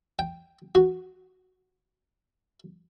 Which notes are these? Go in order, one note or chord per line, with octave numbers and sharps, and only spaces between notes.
G5
F#4